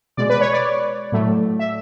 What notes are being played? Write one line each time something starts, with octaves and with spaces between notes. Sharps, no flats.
B2 G#3 D5
B4
C#5
D5
A2 F#3 A3
E5